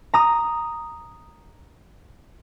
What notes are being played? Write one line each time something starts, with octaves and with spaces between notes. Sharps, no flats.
A#5 D#6